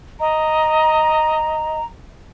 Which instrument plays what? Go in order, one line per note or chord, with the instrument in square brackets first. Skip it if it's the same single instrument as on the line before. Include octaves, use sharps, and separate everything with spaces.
[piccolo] D#5 [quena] A#5